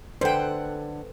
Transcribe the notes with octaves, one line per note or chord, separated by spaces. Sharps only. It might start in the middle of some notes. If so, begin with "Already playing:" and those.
D3 A4 B4 C5 F#5 G5